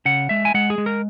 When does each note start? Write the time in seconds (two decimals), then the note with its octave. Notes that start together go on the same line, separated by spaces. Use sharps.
0.05 C#3 F#5
0.29 G#3 E5
0.45 G#5
0.54 G#3 F#5
0.70 G#4
0.78 G#3
0.86 A#4